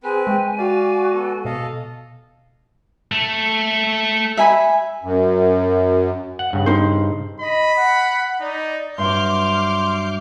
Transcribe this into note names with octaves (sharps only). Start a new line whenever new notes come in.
C4 G#4 B4 G#5
G#3 G5
F#4 D5 F5
B3 A4
B2 A4 D#5 F5
A3
E5 G#5 B5
F#2
F#5
G2 C#3
D#4 C5
D#5 B5
F#5
D#4 D5
G2 F#3 E5 C6 D6 F6 G6